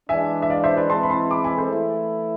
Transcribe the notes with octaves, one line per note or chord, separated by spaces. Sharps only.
E3 G#3 D4 E5 G#5
E5
D5 F5
C5 E5
B4 D5
E3 G#3 C4 E4 A5 C6
B5
A5 C6
B5 D6
G#5 B5
A4 C5
E3 A3 E4